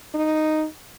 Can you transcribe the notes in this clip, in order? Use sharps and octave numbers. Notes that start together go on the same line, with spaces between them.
D#4